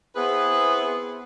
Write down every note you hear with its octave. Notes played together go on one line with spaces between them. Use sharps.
B3 C4 E4 G#4 B4